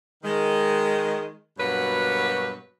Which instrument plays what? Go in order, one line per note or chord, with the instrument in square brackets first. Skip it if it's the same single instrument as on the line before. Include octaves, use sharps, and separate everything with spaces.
[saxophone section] D#3 G#3
G2 B2 F#3 A#3 F#4 B4